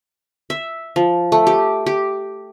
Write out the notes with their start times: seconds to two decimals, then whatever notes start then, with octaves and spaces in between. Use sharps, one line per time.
0.50 E5
0.96 F3
1.32 A3
1.47 G4
1.86 G4